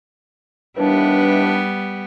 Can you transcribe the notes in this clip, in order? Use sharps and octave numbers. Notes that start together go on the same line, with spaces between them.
D#2 E3 G3 B3 D4